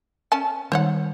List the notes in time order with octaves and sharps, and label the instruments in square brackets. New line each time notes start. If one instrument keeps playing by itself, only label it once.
[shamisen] C#4 G#5 A5
[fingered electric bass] D#3 G3 [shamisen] C5 C#5 F#5